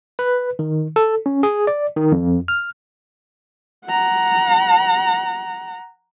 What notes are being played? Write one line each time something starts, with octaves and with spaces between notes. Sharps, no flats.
B4
D#3
A4
C#4
G#4
D5
D#3
F2
F6
F#5 A#5